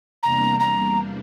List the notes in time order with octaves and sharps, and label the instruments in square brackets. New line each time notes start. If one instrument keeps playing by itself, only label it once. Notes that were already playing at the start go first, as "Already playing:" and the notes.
[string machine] E2 C3 G3 A#3 D4 [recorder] A#5
[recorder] A#5